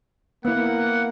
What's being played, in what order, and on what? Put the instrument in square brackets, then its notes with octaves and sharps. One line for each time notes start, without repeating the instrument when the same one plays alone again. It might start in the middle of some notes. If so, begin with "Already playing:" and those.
[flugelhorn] A#3 [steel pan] B3 E4 [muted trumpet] F#5